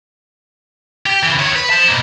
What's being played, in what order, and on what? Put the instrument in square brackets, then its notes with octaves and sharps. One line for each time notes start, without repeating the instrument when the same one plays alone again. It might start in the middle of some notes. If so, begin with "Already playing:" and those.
[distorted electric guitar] G4
C#3 E3
D#3 C#5
B4
C5 A5
B2 A#3